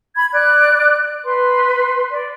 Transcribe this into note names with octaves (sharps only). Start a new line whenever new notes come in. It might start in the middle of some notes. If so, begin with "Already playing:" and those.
B5 G#6
D5 F#6
B4 C6
D5